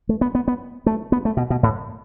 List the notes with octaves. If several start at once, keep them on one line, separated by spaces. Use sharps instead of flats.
A3
B3
B3
B3
A3
B3
A3
B2
B2
A2